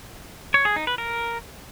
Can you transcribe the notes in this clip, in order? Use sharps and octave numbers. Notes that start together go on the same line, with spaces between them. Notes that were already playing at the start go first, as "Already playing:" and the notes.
C#5
G#4
D#4
B4
A#4